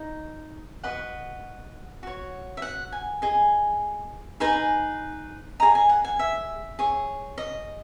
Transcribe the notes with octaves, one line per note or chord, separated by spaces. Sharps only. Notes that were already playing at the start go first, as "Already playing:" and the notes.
Already playing: D#4 D#5
F#4 B4 D#5 F#5
F#4 C#5
E5
F#5
G#5
G#4 D#5
D#4 G#4 B4 D#5 G#5
G#4 D#5 A#5
G#5
F#5
G#5
E5
G#4 C#5
D#5